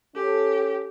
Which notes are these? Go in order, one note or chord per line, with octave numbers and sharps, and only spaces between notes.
C#4 G4 A4